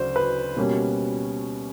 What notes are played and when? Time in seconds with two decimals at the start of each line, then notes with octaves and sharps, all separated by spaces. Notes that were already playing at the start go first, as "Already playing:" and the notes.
Already playing: D2 C#3 F#3 C5 D5
0.16 B4
0.57 B2 G3 A#3 C#4